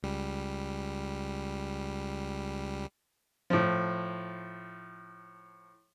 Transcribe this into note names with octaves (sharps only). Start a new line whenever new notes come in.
C#2 G3
A2 F3